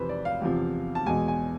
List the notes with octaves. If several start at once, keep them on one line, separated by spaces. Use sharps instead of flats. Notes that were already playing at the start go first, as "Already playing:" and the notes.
Already playing: F2 C3 E3 B4 C5
D5
F5
E2 C3 F3
A5
E2 B2 G#3 G#5
G#5